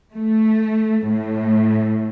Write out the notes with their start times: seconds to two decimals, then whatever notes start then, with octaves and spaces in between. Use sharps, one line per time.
0.14 A3
1.07 A2